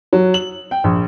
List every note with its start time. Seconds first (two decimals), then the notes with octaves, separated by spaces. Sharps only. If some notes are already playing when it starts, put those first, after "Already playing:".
0.13 F#3
0.34 F#7
0.71 G5
0.84 A#1